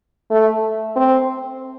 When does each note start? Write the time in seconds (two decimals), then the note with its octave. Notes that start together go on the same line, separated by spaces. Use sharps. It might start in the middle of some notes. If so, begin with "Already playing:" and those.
0.31 A3
0.96 C4